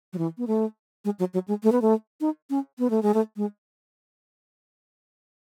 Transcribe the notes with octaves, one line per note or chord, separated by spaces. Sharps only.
F#3
E3
B3
A3
G#3
F#3
F#3
G#3
A3
B3
A3
D#4
C#4
B3
A3
G#3
A3
G#3